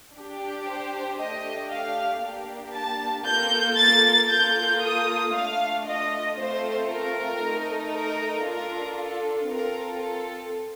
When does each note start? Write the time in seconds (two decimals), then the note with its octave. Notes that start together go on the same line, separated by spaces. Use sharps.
0.14 D4 G4
0.66 C5
1.18 A3 D4 G4 D#5
1.69 F5
2.21 A#3 D4 G4
2.74 A5
3.25 A#3 F4 A4 G6
3.77 A6
4.29 A#3 F4 A4 G6
4.82 D#6
5.32 A3 D4 F4 F5
5.85 D#5
6.37 A3 C4 F4 A4 C5
6.89 A#4
7.40 A3 D#4 A4
7.92 A#4
8.44 D4 F4 A4 A#4
8.96 A4
9.48 C4 F4 A4 A#4
10.01 A4